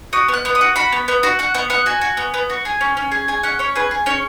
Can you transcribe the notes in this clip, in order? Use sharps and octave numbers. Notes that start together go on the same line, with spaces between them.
F#4 D#6
B3
F#6
B3
D#6
F#4
F#4 B5
B3
B3
F#4
F#4 F#5
B3 F#5
B3 F#5
F#4 G#5
F#4
B3
B3
F#4
G#4 G#5
C#4
C#4
G#4
G#4 G#5
C#4 F#5
C#4 C#5
G#4 B4
G#4
C#4 C#5